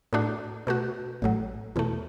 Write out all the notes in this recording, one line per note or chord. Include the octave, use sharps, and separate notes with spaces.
A2 A3 D4 F#4
B2 A3 F#4
A1 A2 F#3
E2 B2 A3